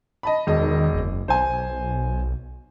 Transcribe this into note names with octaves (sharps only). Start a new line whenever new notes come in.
D#5 A5 B5
E1 D#3 D#5
F#1
B1 C5 G#5